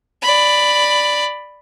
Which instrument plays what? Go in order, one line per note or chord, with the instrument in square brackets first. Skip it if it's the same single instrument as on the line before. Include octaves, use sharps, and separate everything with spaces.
[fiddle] D5 B5